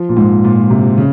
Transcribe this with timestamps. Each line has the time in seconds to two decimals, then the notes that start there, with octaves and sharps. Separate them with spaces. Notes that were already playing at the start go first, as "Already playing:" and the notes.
Already playing: F3
0.09 A#2
0.17 G#2
0.44 A#2
0.70 C3
0.98 C#3